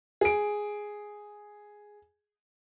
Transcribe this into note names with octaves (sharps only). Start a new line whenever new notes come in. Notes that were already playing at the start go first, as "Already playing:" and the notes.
G#4 D7